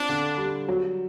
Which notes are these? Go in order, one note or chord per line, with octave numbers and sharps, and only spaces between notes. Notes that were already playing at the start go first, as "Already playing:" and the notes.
Already playing: C4 D4 F4
D3
G3
F#3